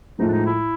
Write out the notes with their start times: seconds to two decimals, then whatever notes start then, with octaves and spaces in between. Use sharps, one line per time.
0.19 A2 F3 G#3 D#4
0.28 D4
0.32 D#4
0.46 E4